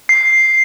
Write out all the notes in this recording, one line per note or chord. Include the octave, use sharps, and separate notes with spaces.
C7